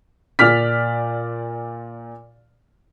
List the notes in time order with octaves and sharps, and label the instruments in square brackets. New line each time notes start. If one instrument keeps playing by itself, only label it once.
[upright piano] A#2 D5 F6 B6